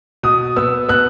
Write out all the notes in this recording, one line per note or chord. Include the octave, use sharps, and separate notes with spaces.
B2 D#6
B3 E6
B3 F#6